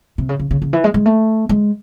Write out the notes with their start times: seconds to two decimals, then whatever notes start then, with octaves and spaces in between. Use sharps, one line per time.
0.18 C3
0.29 C#3
0.39 C#3
0.51 C#3
0.62 C#3
0.73 E3
0.84 G#3
0.94 G#3
1.06 A3
1.49 G#3